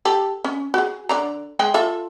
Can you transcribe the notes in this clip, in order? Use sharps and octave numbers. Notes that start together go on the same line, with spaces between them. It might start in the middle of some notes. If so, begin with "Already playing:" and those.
G4 A4
C#4
F#4 G#4
D3 D5 A#5
G#3 G#4 G5
F4 A4 E5